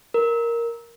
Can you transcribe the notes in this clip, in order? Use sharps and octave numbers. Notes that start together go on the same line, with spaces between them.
A#4